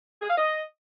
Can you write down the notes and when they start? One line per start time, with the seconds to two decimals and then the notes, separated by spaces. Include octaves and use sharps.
0.22 G#4
0.30 F5
0.38 D#5